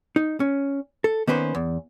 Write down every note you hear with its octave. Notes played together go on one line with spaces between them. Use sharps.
D#4
C#4
A4
D#3 A#3 B3 C#4 B4 C5
E2